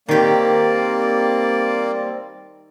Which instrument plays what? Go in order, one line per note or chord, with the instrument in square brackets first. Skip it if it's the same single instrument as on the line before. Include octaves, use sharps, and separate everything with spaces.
[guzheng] D#3 G4 [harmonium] G3 C4 [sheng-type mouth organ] A#3 D5